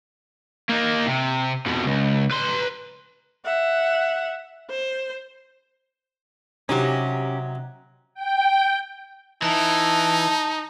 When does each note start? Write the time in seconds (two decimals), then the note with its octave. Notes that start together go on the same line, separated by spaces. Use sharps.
0.70 A#3 D#4
1.07 C3
1.66 F2 B2
1.86 C#2
2.31 B4 C6
3.45 E5 F#5
4.70 C5
6.69 C3 F#3 C#4 D#4 G4
8.14 G5
9.42 E3 D#4 A5